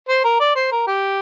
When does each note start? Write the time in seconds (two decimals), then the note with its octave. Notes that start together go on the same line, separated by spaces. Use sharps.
0.09 C5
0.24 A#4
0.40 D5
0.56 C5
0.72 A#4
0.87 G4